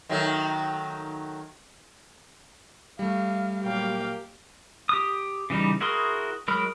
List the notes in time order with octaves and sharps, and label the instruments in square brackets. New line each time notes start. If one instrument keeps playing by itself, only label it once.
[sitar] D#3 F#3 A3
[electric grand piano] G3 A3 [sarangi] F5
[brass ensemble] A#2 F#3 A#3 [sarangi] G4 [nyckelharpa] F5 G5
[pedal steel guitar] G4 D#6
C#3 E3 G3 D#4
E4 F#4 G#4 A#4 C6
F#3 G#3 A#4 B5